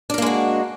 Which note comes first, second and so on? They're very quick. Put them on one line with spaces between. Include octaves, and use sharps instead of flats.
D4 A#4 A#3 G#3 F#4